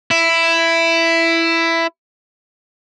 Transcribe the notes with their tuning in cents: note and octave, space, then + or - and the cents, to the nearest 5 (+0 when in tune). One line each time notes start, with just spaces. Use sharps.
E4 +10